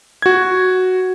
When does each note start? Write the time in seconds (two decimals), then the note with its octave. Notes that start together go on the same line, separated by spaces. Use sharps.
0.22 F#4 G#6